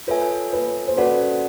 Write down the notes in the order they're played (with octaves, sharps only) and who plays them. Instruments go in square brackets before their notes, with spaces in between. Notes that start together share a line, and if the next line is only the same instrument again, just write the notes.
[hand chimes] F4 A4 C#5 E5 G#5 [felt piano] B4
[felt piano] B4
C5
[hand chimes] C#4 F#4 A4 D5 F#5 [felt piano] B4